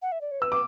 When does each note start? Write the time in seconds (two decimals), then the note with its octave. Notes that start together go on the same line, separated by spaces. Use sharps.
0.02 F#5
0.12 E5
0.21 D5
0.31 C#5
0.41 B4 E6
0.52 D6